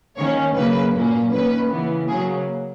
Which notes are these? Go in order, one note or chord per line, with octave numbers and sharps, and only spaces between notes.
D#3 A#3 C#4 C#5
C#3 F#3 A#3 B4
A#2 F#3 A#3 C#4
D#3 A#3 C#4 B4
C#3 E3 B3
C#3 F#3 A#3 G#4